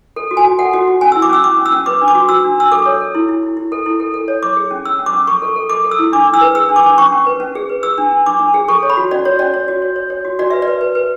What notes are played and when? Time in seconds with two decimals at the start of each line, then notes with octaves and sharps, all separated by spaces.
0.16 A4
0.31 F#4
0.37 G#5
0.45 F#4
0.59 A4 F#5
0.73 F#4
0.88 F#4
1.01 C#4 G#5
1.12 E6
1.15 E4
1.22 D6
1.30 C#4 E6
1.43 C#4 D6
1.58 C#4
1.66 E6
1.72 C#4
1.86 B4 D6
2.01 D4
2.08 D6
2.15 F#4
2.29 F#4 E6
2.44 D4
2.58 D4 E6
2.72 A4 D6
2.86 C#5
3.01 A4
3.15 E4
3.29 E4
3.43 E4
3.57 E4
3.72 A4
3.86 E4
4.00 A4
4.14 A4
4.28 C#5
4.43 C#5 D6
4.57 G#4
4.71 C#4
4.85 C#4 E6
4.99 C#4
5.06 D6
5.13 C#4
5.27 A4 C#6
5.42 A4
5.56 A4
5.70 A4 D6
5.84 A4
5.91 E6
5.99 E4
6.13 D4 D6
6.27 D4
6.34 E6
6.41 B4
6.55 G#4 E6
6.69 D4
6.76 D6
6.84 D4
6.97 C#4 C#6
7.12 C#4
7.26 B4
7.40 C#4
7.55 G#4
7.69 B4
7.83 G#4 E6
7.98 D4
8.11 D4
8.26 D4 D6
8.39 D4
8.54 G#4
8.68 A4 C#6
8.83 C#5
8.90 B5
8.97 F#4
9.11 C#4 D5
9.25 F#4 C#5
9.39 C#4 D5
9.54 C#5
9.68 F#4
9.82 C#5
9.96 C#5
10.10 C#5
10.25 F#4
10.39 F#4 D5
10.50 B4 E5
10.62 D5
10.68 B4
10.81 B4
10.95 B4